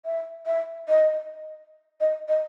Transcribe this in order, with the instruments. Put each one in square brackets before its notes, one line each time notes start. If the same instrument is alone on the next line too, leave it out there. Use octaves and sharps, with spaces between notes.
[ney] E5
E5
D#5
D#5
D#5